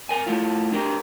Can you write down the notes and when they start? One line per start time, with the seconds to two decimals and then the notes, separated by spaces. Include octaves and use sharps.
0.09 A#4 G#5
0.26 A3 E4 F4
0.72 D4 G4 A#4